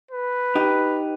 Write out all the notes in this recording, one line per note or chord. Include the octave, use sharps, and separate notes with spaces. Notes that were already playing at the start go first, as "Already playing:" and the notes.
B4
D#4 G4